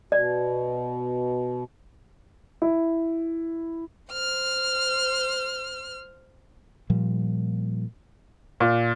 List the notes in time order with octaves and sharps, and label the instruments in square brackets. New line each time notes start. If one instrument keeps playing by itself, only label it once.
[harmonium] B2 [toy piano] D5
[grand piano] E4
[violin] C5 F6
[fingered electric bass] A#2 F3 G3
[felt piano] A#2